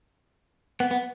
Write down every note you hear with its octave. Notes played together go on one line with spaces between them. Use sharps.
B3
B3